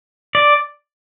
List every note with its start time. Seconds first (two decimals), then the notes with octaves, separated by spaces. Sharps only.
0.35 D5